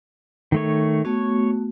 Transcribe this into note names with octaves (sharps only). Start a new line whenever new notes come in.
D#3 A3 C#5
A3 B3 F#4 C#5